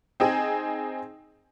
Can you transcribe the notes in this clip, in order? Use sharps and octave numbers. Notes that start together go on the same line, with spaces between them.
C4 D#4 G#4